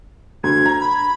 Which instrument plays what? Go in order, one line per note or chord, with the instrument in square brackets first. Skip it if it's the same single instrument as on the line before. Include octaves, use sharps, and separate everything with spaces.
[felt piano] D2 [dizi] G#6
[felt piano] A#5
[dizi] B5